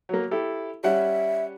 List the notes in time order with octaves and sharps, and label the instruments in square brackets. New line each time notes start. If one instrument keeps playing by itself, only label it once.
[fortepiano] F#3 A#3
E4 G4 A4
[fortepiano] G3 C#4 F#5 [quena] E5